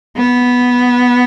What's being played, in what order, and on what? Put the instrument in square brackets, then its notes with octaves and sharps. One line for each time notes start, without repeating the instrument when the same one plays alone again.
[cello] B3